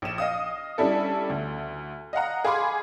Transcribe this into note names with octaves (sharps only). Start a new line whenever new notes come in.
A#1 E7
D#5 F5 D#6
G3 C#4 D4 E4 A4
D2
D#5 F5 F#5 A#5
G#4 F5 G#5 B5 C6 D6